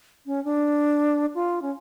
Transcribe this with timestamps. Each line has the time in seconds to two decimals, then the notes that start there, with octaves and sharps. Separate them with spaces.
0.26 C#4
0.45 D4
1.35 F4
1.62 C#4